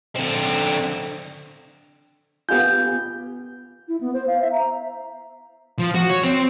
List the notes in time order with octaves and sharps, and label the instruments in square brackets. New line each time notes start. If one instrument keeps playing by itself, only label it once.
[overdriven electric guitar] D3 C4
[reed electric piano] B3 F4 [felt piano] G4 F5 G#5 [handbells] G6
[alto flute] E4
B3
C5
F5
E5
A#5
[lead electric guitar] F3
F#4
C#5
C4